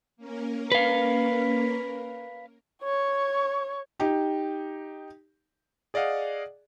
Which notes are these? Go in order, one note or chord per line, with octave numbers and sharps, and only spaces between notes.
A#3 C#4 A#4
B4 F5
C#5 C#6
D#4 G4
G#4 D5 D#5 F5 F#5